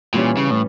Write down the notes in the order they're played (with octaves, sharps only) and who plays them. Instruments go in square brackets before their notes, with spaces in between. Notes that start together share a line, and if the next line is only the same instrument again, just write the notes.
[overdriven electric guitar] A#2 [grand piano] E3 G3 C#4
[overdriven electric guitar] C#3
A2